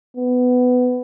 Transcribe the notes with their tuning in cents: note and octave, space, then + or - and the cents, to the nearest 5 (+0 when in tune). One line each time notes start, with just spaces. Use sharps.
B3 +15